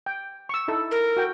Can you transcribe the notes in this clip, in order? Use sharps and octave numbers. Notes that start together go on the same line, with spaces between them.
G5
C#6 E6
D#4 E4 A4
A#4
F#4 G5